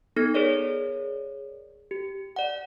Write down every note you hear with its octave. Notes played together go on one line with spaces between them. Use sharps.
B3 D#4 A4 A#6 C#7
G#4 A#4 C#5 D5
G4
D5 F#5